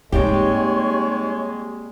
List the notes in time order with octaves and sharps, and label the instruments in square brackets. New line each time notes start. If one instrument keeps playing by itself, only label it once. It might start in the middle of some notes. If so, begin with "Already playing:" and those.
[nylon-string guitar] G#2 G4 [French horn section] G3 G#3 [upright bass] A#3 C4 [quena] C#5